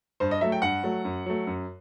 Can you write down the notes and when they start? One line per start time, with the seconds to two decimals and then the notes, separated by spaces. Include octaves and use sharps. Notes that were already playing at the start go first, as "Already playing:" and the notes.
0.20 G2 C5
0.31 D#5
0.41 F#3 E5
0.44 A3
0.52 G5
0.62 G2 F#5
0.83 F#3 A3
1.05 F#2
1.26 F#3 A3
1.47 F#2